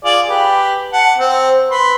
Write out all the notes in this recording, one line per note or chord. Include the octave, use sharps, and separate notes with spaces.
F4 G#4 D5
G4 B4
F#5 A5
C4
B4 C6